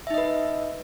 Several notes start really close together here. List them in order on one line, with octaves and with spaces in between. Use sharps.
E5 D#4 D#5 B4